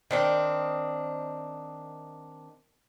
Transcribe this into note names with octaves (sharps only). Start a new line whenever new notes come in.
D#3 C4 D4